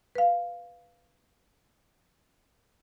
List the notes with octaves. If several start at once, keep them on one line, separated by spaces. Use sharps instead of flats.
B4 F5